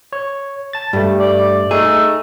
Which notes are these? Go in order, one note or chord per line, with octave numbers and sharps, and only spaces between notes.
C#5
A5 A6
G2 G3 A3
D5
A3 D#4 G#4